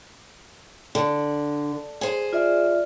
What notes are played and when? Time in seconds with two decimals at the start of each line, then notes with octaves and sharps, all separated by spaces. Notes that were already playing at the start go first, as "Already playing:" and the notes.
0.95 D3
2.01 G#4 C5
2.33 F4 D5 E5